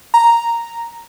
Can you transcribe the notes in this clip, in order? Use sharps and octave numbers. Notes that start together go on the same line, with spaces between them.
A#5